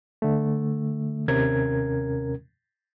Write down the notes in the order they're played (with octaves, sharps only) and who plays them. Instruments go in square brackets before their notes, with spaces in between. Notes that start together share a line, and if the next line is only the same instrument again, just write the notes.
[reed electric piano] D3 A3
D#2 C3 C#4 A#4 G#6